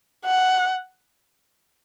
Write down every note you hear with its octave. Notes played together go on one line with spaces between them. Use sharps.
F#5